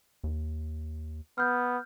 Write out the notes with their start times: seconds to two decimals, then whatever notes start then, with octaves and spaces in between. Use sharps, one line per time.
0.24 D#2
1.38 B3 F6 G6